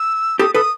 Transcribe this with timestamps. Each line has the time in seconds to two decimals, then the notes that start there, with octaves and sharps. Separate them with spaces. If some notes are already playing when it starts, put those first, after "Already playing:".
Already playing: E6
0.39 G4 A4 D#6
0.55 A4 B4 D#6